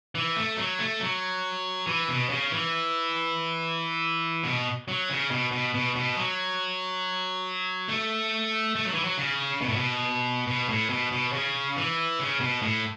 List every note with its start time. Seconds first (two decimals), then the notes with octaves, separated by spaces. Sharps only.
0.15 E3
0.36 A3
0.57 F#3
0.79 A3
1.01 F#3
1.87 E3
2.08 B2
2.30 C#3
2.52 E3
4.44 B2
4.88 F#3
5.10 C#3
5.31 B2
5.52 B2
5.74 B2
5.96 B2
6.17 F#3
7.88 A3
8.76 A3
8.85 F#3
8.94 E3
9.04 F#3
9.18 C#3
9.61 B2
9.68 A2
9.76 B2
10.47 B2
10.69 A2
10.90 B2
11.12 B2
11.33 C#3
11.77 E3
12.19 C#3
12.40 B2
12.62 A2